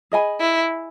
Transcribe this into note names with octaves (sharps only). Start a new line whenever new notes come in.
G#4 D#5 G#5 B5
E4